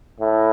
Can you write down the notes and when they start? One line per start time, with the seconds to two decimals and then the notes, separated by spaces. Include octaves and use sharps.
0.20 A2